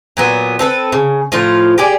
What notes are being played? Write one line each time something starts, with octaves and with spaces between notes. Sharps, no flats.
A#2 F#3 B3
C4 A4 B4
C#3
A2 F3 F4
G4 G#4 D5